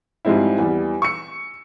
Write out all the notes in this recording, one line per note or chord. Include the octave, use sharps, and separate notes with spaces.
G#2 F3 G3 G#3 C4 E4
E2 G3
C#6 E6 C#7